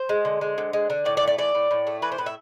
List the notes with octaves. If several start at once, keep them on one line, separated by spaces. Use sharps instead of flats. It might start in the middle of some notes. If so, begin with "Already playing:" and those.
Already playing: C5
G#3
D3
G#3
D3
G#3
D3
A2 D5
D5
A3
D5
E3 D5
A2
A2
A3
E3 B4
C5
A2 B4
E5